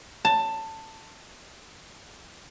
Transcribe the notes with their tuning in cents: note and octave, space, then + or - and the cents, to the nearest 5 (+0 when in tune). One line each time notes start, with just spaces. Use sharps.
A5 +15